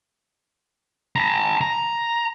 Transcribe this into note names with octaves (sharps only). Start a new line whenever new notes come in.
A5 A#5
A#5